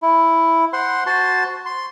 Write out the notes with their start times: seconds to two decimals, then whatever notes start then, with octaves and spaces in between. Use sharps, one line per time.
0.02 E4
0.73 C5 F#5 C6
1.06 F#4 C5 A5 C6
1.66 C6